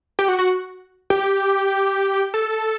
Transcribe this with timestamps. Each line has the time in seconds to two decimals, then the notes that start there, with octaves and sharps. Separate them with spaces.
0.19 G4
0.28 F#4
0.39 F#4
1.10 G4
2.34 A4